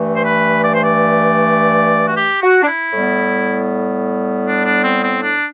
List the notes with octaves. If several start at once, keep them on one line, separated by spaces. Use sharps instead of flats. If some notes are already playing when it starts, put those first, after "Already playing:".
Already playing: G2 E3 A3
C5
B4
D5
C5
D5
F#4
G4
F#4
D4
E4
A2 G3 B3
D4
D4
C4
C4
D4